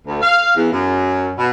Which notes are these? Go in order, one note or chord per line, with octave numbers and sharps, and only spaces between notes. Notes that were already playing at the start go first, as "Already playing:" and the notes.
D2
F5
E2
F#2
B2